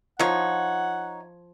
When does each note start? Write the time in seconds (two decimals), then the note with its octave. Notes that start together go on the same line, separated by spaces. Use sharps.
0.19 F3 D#4 C#5 F#5